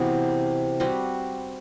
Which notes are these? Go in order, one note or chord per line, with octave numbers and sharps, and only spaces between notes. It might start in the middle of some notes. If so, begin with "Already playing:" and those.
Already playing: C3 E3 B3 F#4
G3 C4 F#4 B4